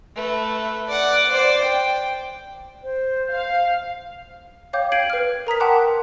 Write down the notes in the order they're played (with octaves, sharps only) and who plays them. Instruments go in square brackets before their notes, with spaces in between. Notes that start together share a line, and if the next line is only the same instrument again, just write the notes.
[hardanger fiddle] A3 B4
D5 F#5
C5 D5
G5
[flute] C5
[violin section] F5
[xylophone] C#5 F5 G5 D6 G6
G5 G#6 C7 D7 D#7 F#7
B4 F6
A#4 A#5 D#6 B6
F#5 G5 A5 C6 D6 F#6